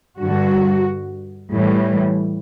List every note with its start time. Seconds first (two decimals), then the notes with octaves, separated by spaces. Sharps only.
0.19 G2 D3 G3 F#4
1.52 A2 E3 G3